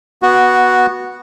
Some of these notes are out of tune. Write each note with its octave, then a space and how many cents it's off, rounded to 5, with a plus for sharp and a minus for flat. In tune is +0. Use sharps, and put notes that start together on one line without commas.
B3 -15 F#4 +0